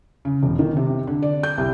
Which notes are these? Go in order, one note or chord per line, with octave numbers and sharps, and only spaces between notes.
C#3
E1
D#3
C3
D3
D5
G6
C2